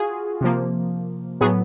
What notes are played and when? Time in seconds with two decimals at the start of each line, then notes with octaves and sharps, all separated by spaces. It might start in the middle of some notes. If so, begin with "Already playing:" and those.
Already playing: F4 F#4 G#4
0.41 C3 F3 A#3
1.41 A2 F#3 B3 G#4